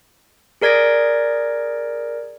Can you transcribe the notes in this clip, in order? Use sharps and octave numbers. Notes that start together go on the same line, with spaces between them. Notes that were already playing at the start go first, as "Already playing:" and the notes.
G#4 A#4 D5 G#6 A#6 D7